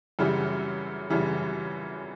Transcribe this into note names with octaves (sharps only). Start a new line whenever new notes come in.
F#2 C#3 E3 G3
F#2 C#3 E3 G3